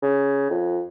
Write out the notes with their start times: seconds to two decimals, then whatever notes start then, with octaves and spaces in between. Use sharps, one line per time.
0.02 C#3
0.50 F2